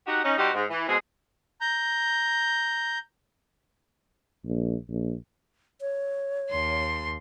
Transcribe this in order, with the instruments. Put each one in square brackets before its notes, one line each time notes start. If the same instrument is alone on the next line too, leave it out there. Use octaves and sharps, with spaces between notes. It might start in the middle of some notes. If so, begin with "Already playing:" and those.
[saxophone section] D#4 F#4 G4 F#5
C#4 D#4
G3 C4 D#4 F#4 G4
G#2
E3
B2 G#3 C4 G#4
[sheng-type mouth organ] A#5 G6
[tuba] A#1
A#1
[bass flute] C#5
[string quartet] D#2 C6